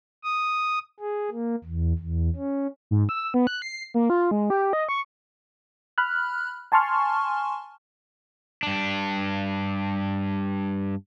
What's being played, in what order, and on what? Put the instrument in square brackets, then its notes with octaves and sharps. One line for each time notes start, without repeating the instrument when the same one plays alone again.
[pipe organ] D#6
G#4
A#3
E2
E2
C#4
[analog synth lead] G#2
E6
B3
F#6
C7
A#3
F4
G#3
G4
D#5
C#6
[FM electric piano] B5 F6 F#6
G#5 A5 C6 C#6 F6
[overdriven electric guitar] G2 D4